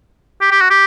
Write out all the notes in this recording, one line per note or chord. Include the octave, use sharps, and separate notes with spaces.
G4
G4
F#4
G4